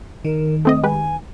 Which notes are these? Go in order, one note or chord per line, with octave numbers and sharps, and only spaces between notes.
D#3 A#4
A3 C4 D#5 D#6
G#3 G4 B4 G#5